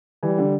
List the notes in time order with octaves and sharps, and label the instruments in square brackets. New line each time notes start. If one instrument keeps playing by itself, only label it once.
[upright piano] E3 [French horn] G3
[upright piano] D3